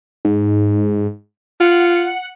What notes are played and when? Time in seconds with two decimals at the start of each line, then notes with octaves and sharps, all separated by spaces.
0.25 G#2
1.60 F4 F#5